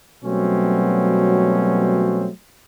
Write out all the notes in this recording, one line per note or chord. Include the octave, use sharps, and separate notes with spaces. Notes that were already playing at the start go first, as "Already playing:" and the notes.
B2 F#3 G3 A3 C4 C#4